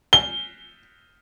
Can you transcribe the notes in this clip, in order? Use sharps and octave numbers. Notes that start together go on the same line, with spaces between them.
G7